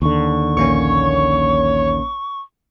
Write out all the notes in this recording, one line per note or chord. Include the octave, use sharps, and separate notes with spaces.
D#2 D3 C#6
A#1 A#3 C#4 C#5